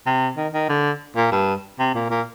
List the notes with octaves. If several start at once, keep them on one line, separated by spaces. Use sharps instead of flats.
C3
D#3
D#3
D3
A#2
G2
C3
A#2
A#2